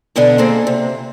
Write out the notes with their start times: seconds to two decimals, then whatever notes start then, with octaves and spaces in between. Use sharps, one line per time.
0.16 B2 D3 B3 D4
0.38 A#3 C4 G#4 A4 C5
0.67 C3